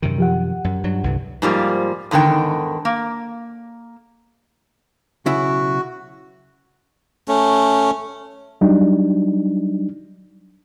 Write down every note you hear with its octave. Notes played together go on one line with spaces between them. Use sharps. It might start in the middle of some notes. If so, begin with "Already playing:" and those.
F#2 C3 D#3
F3 G4 F#5
F#2
G2 F#3
C2 G2 D3
G#2 F3 G3 A#3
E2 G#2 D3 D#3 G5
A#3
B1 C#3 E4 F#4
A3 C#4
F#3 G3 D4 D#4